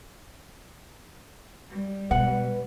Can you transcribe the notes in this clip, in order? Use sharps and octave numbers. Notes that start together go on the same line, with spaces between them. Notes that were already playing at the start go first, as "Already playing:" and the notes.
G3
B2 B4 F#5